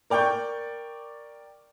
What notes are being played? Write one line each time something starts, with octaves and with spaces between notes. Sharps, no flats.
A#4 D5 G5 C#6 G6